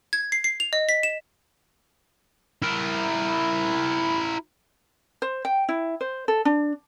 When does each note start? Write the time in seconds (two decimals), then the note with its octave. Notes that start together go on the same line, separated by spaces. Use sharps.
0.13 G#6
0.32 C7
0.44 C7
0.60 F7
0.73 D#5
0.89 B6
1.03 E7
2.62 E4 A#4
5.22 C5
5.45 G5
5.69 E4
6.01 C5
6.28 A4
6.45 D4